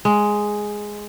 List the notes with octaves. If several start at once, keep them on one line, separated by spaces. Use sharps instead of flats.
G#3